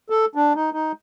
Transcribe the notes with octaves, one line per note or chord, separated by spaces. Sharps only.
A4
D4
D#4
D#4